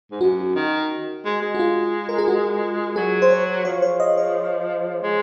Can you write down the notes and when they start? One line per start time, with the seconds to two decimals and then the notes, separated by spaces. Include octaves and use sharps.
0.11 G#2
0.21 F#2 F#4
0.55 D#3
1.25 G#3
1.42 G#3
1.55 F#4
1.59 F4
2.09 A#4
2.18 G#4
2.28 F#4
2.96 F#3 G#4
3.22 C5
3.31 C#5
3.65 F3 C#5
3.82 C#5
4.00 D#5
4.17 C#5
5.02 G#3